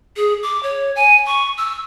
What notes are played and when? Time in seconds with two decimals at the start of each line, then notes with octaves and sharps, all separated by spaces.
0.16 G#4
0.43 D6
0.63 C#5
0.95 G#5
1.27 C#6
1.57 E6